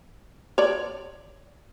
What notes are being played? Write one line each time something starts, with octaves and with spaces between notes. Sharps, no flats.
C#5 D5